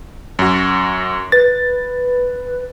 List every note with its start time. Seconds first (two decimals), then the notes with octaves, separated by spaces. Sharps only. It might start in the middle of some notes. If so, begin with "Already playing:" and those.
0.39 F#2 F#4
1.32 B4 A6